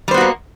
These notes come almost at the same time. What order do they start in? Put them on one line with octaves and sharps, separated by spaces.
G3 C5 B3 F#4 A#3